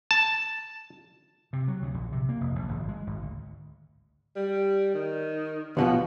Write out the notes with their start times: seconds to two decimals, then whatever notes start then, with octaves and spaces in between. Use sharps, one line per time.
0.11 A5
1.53 C3
1.68 F#3
1.82 D2
1.94 A#1
2.12 C3
2.29 A#3
2.41 F1
2.56 A#1
2.69 G#1
2.89 G#3
3.07 G#1
3.22 D2
4.36 G3
4.94 D#3
5.77 D2 B2 F3 B3